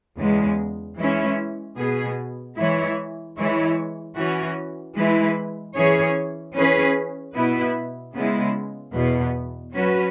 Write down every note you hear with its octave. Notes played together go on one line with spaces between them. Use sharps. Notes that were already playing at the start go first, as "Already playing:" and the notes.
E2 C#3 G#3
E3 G#3 C#4 E4
B2 B3 G#4
E3 G#3 E4 C#5
E3 G#3 E4 C#5
E3 C#4 F#4
E3 G#3 E4 B4
E3 C#4 G#4 C#5
E3 C#4 G#4 B4
B2 B3 E4 B4
C#3 G#3 B3 E4
E2 B2 B3
F#3 C#4 F#4 B4